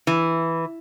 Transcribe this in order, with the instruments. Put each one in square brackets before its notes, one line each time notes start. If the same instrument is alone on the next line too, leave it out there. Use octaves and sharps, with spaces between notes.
[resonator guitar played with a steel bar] E3